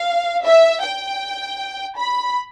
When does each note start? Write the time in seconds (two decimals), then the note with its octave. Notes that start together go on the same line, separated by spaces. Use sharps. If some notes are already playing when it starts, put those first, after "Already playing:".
Already playing: F5
0.44 E5
0.82 G5
1.97 B5